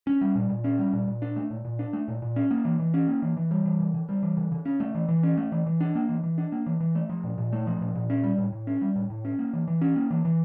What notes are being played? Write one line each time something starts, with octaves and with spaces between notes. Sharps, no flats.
C#4
G3
A#2
A#2
C#4
G3
A#2
A#2
D4
A3
A#2
A#2
D4
A3
A#2
A#2
C#4
A#3
E3
E3
C#4
A#3
E3
E3
G3
E3
C#3
C#3
G3
E3
C#3
C#3
C#4
A3
E3
E3
C#4
A3
E3
E3
D4
A#3
E3
E3
D4
A#3
E3
E3
A3
F3
A#2
A#2
A3
F3
A#2
A#2
C#4
G3
A2
A2
C#4
G3
A2
A2
C#4
A#3
E3
E3
C#4
A#3
E3
E3